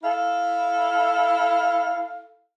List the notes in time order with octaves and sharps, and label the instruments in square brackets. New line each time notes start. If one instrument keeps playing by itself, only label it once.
[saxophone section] E4 A4 F5